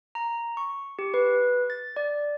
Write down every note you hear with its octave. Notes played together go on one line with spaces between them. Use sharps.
A#5
C#6
G4
B4
A6
D5